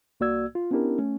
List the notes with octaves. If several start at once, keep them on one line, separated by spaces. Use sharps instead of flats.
C2 A#3 F#4 D5 E6 G#6
F4
B3 C#4 D4 E4 G4 A#4
A3 C#4